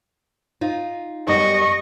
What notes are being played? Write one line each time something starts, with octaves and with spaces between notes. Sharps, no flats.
D#4 F4
F#2 G3 B3 D#5 C#6